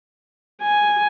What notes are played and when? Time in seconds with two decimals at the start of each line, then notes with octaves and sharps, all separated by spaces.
0.62 G#5